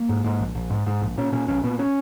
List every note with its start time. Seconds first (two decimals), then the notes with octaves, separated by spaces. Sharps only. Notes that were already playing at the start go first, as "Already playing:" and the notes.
Already playing: A#3
0.09 G#2
0.24 G#2
0.40 A#1
0.55 A#1
0.70 G#2
0.87 G#2
1.01 A#1
1.18 A#2 C#4
1.32 A#2 C#4
1.48 B1 C#4
1.63 A#2 B3
1.79 C#4